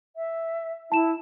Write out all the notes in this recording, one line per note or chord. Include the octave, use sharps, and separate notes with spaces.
E5
E4 A5 E7